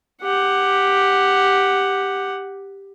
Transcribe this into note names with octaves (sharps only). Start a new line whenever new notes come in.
G4 F#5